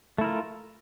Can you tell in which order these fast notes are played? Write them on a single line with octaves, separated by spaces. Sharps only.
A3 E4 A#4 F4